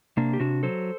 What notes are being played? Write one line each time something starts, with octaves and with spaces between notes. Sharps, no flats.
C3 A#3 D4
G4
C3 D4 F#4
F#3 A4 C5